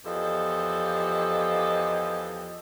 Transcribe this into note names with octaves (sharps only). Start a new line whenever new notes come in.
E2 F3 G4 A4 D#5